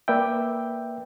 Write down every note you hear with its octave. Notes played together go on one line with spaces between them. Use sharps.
A#3 B4 D5 E5 G5